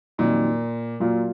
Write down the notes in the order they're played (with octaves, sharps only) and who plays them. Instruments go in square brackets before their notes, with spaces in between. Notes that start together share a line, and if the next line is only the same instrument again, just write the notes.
[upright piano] F2 D#3 F#3 A#3 D#4 [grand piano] A#2
[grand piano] A#2 [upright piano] F#3 A#3 F4